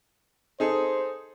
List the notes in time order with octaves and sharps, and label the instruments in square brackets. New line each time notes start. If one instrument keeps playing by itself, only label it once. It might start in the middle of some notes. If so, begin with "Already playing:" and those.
[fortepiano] D#4 G#4 A4 [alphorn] C5